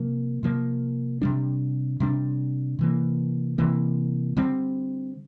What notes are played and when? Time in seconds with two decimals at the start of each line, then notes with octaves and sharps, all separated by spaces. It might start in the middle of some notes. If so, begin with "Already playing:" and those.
Already playing: C3 F3 A#3
0.43 C3 F3 A#3
1.22 C3 G3 D4
2.00 C3 G3 D4
2.79 C3 E3 A#3
3.58 C3 E3 A#3
4.37 D3 G3 C4